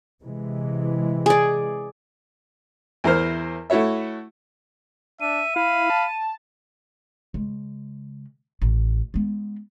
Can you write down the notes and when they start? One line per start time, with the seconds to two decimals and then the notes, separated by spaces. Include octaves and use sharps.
0.23 C3 E3 G#3
1.26 G#4 D5
3.04 E2 E4 A#4 C5 F6
3.70 A3 E4 F#4 C#5 E5
5.21 D4 E5 D#7
5.56 E4 F5 B5
5.90 A5
7.34 C#3 G#3
8.62 A1
9.14 G#3 B3